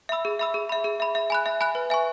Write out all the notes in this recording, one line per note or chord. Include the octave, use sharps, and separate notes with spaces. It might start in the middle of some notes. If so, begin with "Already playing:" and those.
E5 B5 E6
G#4
E5 B5 E6
G#4
E5 B5
G#4
E5 B5
E5
G#5 B5 F#6
E5
G#5 B5 F#6
B4
E5 G#5 C#6